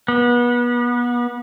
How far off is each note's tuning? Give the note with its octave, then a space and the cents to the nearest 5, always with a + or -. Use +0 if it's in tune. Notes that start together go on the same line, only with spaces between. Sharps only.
B3 -30